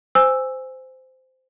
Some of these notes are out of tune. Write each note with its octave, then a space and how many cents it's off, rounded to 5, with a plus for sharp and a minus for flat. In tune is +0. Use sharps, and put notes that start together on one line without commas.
C5 -15 G#5 -15 E6 +0